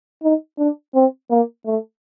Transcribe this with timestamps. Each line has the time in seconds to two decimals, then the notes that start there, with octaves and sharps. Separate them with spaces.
0.23 D#4
0.58 D4
0.94 C4
1.30 A#3
1.66 A3